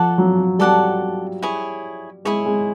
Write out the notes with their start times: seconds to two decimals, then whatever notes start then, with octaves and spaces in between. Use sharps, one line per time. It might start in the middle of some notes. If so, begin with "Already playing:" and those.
Already playing: F3 A4 D5 F#5 A5
0.18 F#3
0.59 G3 A4 D5 F#5 A5
1.43 E4 G#4 C#5
2.25 G#3 E4 G#4 C#5
2.46 G#3